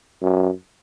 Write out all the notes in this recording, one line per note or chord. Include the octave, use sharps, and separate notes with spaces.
F#2